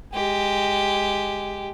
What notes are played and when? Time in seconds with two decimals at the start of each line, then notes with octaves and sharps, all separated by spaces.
0.13 G#3 G4